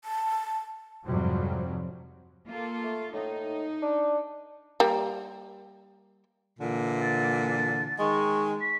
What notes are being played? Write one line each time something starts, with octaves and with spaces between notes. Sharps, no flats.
A5
F2 G#2 C3 F#3 G3
A#3 F4 A4
A3
A2 D#4
D4
G3 A#3
A#2 D3 E3
A6
D#3 G#3 C#6
B6